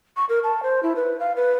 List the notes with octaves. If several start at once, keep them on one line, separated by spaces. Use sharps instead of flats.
C#6
A#4
A5
C5
E4
B4
F5
B4